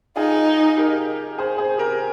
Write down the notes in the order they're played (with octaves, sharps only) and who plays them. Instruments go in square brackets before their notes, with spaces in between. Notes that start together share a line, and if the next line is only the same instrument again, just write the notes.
[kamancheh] D#4 [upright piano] F4 G#4
[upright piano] G4 A#4
G#4 C5
G#4 C5
G4 A#4